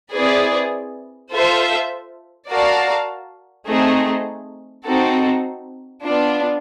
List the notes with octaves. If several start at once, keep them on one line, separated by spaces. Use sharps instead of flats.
C4 E4 G#4 B4 D5
F4 A4 C5 E5
F#4 A#4 D5 F5 A5
A3 C4 D#4 G#4
C4 D#4 F#4 A4
B3 D4 F4